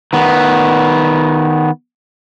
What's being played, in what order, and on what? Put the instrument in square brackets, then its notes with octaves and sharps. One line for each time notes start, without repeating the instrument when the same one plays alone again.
[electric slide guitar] D#3 B3